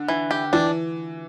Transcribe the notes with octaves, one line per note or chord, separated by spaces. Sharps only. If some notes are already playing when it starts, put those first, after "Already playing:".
Already playing: D3
E3
G4
E3 D4